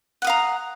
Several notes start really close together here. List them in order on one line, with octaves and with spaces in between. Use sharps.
F#5 D#6 F5 A#5